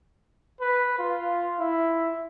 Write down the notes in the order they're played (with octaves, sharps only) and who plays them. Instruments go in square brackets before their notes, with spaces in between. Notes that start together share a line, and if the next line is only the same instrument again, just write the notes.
[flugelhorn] B4
F4
E4